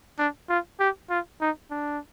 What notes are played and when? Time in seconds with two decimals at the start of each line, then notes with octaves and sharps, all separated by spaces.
0.19 D4
0.49 F4
0.80 G4
1.10 F4
1.41 D#4
1.71 D4